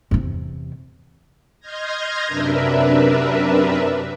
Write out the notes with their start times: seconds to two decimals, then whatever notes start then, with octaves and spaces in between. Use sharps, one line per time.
0.11 E2 C3
1.60 D#5 C6 F6 G6 G#6 A#6
2.26 F#2 C3 D4 A#4 B4 E5